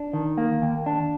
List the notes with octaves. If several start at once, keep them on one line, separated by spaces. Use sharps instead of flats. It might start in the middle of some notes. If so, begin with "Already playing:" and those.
Already playing: D4
D#3
A#3
D#2
D4